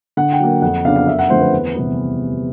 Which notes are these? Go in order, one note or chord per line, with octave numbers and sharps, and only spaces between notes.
D3 F#5
G5
F#3 A#3
F2 F#5
C#3 F#3 B3 D4 F5
F5
F#2 E5
F#5
D3 F3 A3 C4 C5
B4
E2
C3 E3 G3 B3